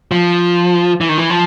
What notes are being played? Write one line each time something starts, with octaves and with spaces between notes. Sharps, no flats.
F3
E3
D#3
E3
F3